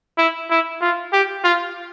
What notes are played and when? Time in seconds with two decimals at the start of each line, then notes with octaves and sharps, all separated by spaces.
0.18 E4
0.51 E4
0.81 F4
1.13 G4
1.44 F4